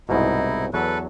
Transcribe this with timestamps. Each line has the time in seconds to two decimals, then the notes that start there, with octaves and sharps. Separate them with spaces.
0.09 C2 G#2 B2 D#4 E4
0.74 E2 F#3 A4 B4